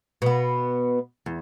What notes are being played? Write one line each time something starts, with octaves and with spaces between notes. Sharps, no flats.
B2 B3
E2